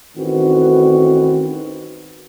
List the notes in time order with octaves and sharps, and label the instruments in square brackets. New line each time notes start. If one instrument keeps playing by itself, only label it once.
[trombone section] A1 D#3 C4 F#4 B4